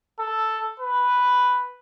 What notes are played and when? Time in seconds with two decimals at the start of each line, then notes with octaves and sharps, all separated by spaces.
0.19 A4
0.80 B4